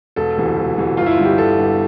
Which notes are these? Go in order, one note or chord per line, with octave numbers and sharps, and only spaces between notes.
E1 A4
D2 C3 E3
E1
D2 C3 E3
G1 F4
E4
F4
G2 D3
G4
G1 A4
G2 D3